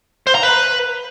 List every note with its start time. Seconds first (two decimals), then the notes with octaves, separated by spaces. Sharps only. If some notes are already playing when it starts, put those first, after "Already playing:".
0.27 C5
0.35 A#5
0.43 B4